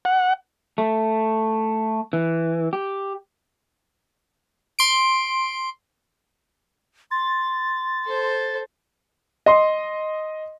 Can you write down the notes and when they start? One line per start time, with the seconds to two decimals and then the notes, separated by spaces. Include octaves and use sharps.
0.05 F#5
0.78 A3
2.13 E3
2.73 G4
4.79 C6 D7
7.11 C6 A6
8.05 A4 C5
9.46 D#5 C6